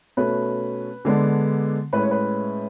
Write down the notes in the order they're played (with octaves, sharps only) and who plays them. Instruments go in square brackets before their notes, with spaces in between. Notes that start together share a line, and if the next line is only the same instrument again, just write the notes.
[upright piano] B2 A3 C#4 B4
D3 G#3 B3 D4
A2 G#3 C#4 B4
C#5
B4